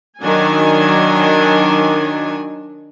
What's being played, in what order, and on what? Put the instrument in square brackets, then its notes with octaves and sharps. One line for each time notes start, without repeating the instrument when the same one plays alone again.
[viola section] D#3 F#3 D4 G#5